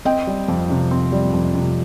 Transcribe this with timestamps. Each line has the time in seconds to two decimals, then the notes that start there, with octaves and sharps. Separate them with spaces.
0.05 C4 D#5 G5
0.27 G3
0.48 F2
0.70 C3
0.91 C4
1.12 G3
1.33 F2
1.55 C3